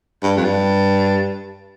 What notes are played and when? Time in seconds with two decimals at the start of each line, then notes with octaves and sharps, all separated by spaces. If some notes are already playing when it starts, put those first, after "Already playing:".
0.23 G2
0.37 F2
0.45 G2